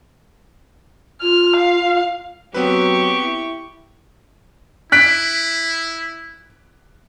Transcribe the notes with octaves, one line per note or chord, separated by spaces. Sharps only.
F4 F6
F5
F#3 B3 C4 G4 B4 C#6
E4
E4 F#6 B6 D7